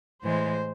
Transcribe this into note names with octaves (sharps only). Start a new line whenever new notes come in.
A2 E3 G#3 C5